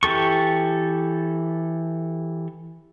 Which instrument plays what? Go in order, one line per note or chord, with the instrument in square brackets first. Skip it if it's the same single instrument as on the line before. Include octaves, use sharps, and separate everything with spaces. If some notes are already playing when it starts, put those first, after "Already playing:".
[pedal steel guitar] E3 G4 A4 C#6